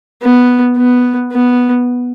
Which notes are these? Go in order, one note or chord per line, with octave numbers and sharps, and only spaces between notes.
B3
B3
B3